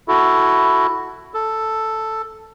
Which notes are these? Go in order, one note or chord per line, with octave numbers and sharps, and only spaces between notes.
E4 F#4 A4
A4